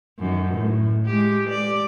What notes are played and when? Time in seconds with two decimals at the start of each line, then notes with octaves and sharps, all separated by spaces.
0.19 F#2 D#3
0.54 A2
1.06 G#3 G4
1.49 D5